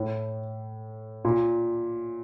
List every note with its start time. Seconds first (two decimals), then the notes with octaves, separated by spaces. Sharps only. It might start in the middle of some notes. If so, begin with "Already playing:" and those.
Already playing: A2
1.25 A#2